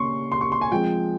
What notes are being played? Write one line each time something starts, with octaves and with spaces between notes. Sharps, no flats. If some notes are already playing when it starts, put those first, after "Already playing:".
Already playing: C#3 G3 A#3 C#4 C6 C#6
C6
C#6
C6
G#5
F3 G#3 C4 G5